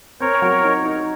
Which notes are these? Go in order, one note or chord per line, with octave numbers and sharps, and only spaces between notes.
C4 A#4 C#5
F#3
D#4
D#4